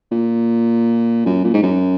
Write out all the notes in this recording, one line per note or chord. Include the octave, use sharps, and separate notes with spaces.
A#2
F#2
A#2
G#2
F#2